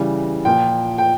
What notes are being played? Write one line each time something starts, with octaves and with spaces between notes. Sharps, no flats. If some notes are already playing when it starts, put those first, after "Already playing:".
Already playing: C#3 E3 G3
A#2 F3 G5
G5